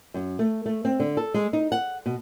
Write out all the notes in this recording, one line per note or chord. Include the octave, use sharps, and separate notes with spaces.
F#2
A3
A3
C4
D3
A4
G#3
D#4
F#5
B2